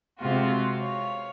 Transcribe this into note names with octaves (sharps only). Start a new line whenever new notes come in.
C3 G#3 F4 F#4
C#5 F5